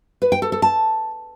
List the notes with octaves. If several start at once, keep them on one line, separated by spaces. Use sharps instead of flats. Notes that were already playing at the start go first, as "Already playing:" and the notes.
B4
G5
A4
A4
A5